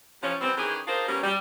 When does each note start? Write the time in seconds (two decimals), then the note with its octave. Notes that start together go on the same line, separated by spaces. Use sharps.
0.22 C3 E3 F3 C#4
0.41 E3 G3 B3 C4
0.57 D#3 E3 C#4 G4 G#4
0.87 D4 D#4 F4 G#4 A#4 C5
1.08 G3 A#3 B3 C#4
1.23 G3